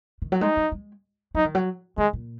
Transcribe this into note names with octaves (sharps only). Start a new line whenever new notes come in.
D#3
F#3
G#3 D#4
F#3
G#3
F#3 D#4
D#3
F#3
D#3 G#3
A#2